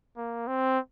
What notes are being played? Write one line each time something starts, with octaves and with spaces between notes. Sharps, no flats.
A#3
C4